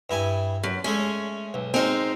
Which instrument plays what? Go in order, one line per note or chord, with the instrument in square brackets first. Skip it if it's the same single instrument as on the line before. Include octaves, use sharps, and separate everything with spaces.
[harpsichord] G2 E4 G#5
[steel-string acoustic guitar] F#2
[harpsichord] G#3 A3 G#4 [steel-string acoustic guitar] C#4
[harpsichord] B1
[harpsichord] G#3 F#4 A#4 [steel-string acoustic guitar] C4 D#4